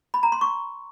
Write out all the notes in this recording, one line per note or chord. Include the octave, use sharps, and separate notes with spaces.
B5
A#5
C6
C#6